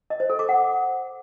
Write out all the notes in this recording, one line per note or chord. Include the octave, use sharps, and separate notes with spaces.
D#5
C5
A4
D6
F#5